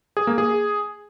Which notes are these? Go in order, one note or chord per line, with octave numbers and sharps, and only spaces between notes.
G#4
A#3
G#4